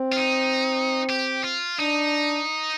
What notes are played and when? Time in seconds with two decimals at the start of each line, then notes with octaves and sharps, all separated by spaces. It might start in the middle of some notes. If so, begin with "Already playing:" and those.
Already playing: C4
0.12 F4
0.16 D#4
1.09 G4
1.44 F4
1.79 D4 D#4